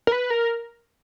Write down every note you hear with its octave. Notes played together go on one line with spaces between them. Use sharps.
A#4
B4
A#4